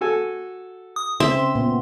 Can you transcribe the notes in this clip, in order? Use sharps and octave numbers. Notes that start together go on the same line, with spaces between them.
F#4 A4 G#5
D#6
C#3 C4 E5 C6
A#2 B3